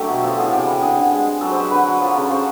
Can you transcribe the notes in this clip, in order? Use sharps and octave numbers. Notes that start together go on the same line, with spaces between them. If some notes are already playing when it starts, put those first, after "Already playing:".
Already playing: D3 F#3 A3 G4
B2
F3 A4
A2 G#4
C3 G4
E3
D3 G#4
D3
G#3
G#3
F#3 A4
F#3 B4 C5
D3 B4
F#3
F3
C#3
C#3 C5